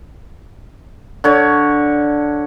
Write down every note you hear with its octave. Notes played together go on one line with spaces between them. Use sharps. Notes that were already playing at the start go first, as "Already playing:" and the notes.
D3 C#5